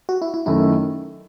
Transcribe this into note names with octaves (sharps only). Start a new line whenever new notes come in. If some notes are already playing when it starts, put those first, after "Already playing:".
F#4
E4
E4
F#2 D#3 A3 D#4 E4